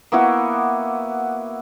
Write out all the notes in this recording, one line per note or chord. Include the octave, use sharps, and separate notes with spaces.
A#3 B3 E4 F#4